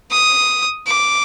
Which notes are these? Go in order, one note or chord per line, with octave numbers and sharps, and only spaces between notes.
D#6
D6